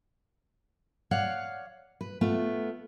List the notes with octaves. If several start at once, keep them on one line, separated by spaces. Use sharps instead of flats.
C#5 D5 F5 F#5
B4
A3 B3 F4